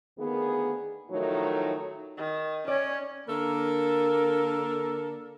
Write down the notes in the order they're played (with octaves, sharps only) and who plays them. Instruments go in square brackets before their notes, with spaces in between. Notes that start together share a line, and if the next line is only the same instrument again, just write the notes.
[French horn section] D2 D#3 A#3 B3 G#4
A2 D#3 F3 F#3 A3 D#4
[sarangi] D#3
[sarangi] C#4 [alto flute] C#5 [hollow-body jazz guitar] D5
[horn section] D3 A#3 A4 A#4